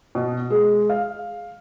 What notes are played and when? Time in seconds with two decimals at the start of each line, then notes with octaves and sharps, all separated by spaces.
0.15 B2
0.51 G#3
0.90 F5